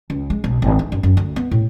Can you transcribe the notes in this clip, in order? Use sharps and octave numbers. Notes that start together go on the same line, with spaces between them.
C#2
G#3
B1
G#1
D#4
F#2
F#2
D2
B3
A2